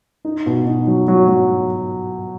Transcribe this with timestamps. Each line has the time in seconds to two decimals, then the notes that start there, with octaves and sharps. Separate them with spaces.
0.25 D#4
0.46 B2
0.67 D#4
0.87 F#3
1.08 F#3
1.28 F#3